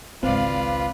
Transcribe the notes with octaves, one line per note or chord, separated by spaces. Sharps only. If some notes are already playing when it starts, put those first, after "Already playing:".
G#1 C#2 C4 F4 B4 D5 F5